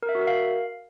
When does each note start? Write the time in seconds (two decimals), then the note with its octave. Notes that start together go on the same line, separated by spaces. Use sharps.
0.03 A#4
0.09 E5
0.15 F#4
0.21 A#4
0.27 F5